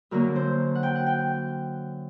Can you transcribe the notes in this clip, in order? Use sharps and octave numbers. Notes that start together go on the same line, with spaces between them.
F#2 D3 F#3 A#3 A#4
C5
F#5
G5
F#5
G5